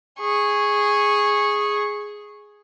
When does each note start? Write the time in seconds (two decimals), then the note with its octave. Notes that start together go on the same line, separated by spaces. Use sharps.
0.20 G#4 C#6